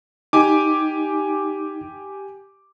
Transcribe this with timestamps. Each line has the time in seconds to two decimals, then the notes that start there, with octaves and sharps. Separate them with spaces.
0.33 D#4 G4 G#5 D6